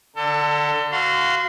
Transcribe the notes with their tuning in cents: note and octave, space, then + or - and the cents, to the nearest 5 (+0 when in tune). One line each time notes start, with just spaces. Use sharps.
D3 +5 A4 +30
F#4 +0 F5 +0 C6 -25